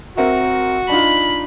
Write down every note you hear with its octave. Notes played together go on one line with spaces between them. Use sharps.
C4 F#4 A#4 E5
D4 D#4 F4 B5